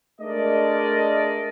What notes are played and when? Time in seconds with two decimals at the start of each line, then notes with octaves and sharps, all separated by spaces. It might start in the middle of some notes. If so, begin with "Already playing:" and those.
0.21 G#3 A3 D4 A#4 D5 D#5